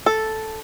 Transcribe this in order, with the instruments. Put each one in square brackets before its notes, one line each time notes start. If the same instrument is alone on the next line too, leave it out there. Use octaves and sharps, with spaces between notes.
[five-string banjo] A4